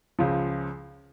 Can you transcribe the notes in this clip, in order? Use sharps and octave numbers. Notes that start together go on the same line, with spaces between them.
C#2 C#3 F3